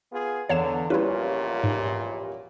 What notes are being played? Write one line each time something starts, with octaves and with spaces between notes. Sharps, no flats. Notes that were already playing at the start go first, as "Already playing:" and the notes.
B3 F4 G#4
E2 D3 C#5 F5 E7
A#1 E2 A#2 G3 C#4 E4 F4 B4
G#2